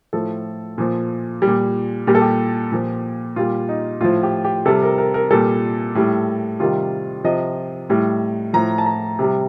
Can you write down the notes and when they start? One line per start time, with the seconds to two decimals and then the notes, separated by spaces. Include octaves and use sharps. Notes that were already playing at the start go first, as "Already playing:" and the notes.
0.13 A2 F3 A4
0.78 A#2 F3
1.42 G3
1.47 A#2
2.07 A#2 G3 G4
2.15 A4
2.22 G4
2.72 A#2 F3
3.36 A#2 G3 F4
3.69 D#4
4.01 A2 F3 F4
4.23 G4
4.44 G4
4.66 C3 G3 A4
4.82 A#4
4.98 A#4
5.14 A#4
5.31 A#2 G3 A4
5.95 A2 G3
6.60 C3 D#3 G3 F4
7.24 C3 F3 D#5
7.90 A2 G3
8.53 A2 F3 A#5
8.78 A5
8.86 A#5
9.19 C3 G3